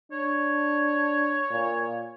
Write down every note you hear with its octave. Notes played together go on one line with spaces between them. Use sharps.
D4 C#5
A#2